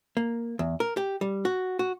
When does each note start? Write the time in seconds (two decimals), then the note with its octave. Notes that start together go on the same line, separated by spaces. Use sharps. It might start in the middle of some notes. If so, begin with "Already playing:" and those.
0.17 A#3
0.59 E2
0.80 A#4
0.97 G4
1.21 G3
1.45 F#4
1.79 F#4